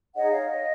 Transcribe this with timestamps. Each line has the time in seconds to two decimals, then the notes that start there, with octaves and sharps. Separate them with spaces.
0.15 D#4 G#4 C#5 D#5 F#5
0.30 C#5 F5
0.45 D#5